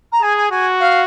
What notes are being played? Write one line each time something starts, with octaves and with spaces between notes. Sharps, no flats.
A#5
G#4 G#5
G#5
F#4 G#5
F5